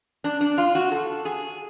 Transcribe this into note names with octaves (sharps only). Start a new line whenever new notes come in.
D4
D4
F4
F#4
A4
G#4